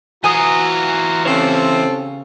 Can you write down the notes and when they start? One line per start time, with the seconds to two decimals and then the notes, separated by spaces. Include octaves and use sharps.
0.24 E3 F4 F#4 G#5 A#5 D#6
1.25 C#3 C4 A4 C5 C#5